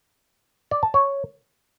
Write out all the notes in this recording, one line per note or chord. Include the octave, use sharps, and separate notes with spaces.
D5
A5
C#5